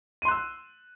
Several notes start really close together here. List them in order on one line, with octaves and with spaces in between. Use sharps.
D#7 C6 F#6 E6